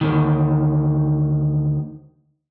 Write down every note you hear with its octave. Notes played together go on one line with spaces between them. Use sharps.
D2 G#2 D#3